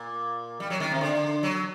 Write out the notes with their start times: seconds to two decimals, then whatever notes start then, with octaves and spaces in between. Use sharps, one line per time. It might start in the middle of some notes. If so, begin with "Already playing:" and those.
Already playing: A#2
0.60 G3
0.70 F#3
0.80 D#3
0.91 C3
1.01 D3
1.43 F#3